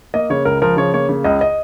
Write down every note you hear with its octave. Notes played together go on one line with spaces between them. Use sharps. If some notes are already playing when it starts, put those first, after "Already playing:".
A#3 D#5
C#3 C#5
C#2 A#4
F3 A#4
C#3 C#5
A#3 C#5
C#3
C#2 D#5
D#5